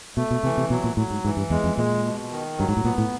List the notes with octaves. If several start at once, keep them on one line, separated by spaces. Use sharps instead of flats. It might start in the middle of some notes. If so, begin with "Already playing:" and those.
B2 A3
B2
C3 E3
C3
B2 F#3
A#2
A2 F#3
G#2
G#2 E3
G2
E2 G#3
F2
A#2 G#3
B2
D#3
G2 F#3
G#2
A2
A#2 B3
A2